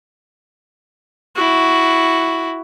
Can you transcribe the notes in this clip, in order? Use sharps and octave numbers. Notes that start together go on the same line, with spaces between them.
E4 F#4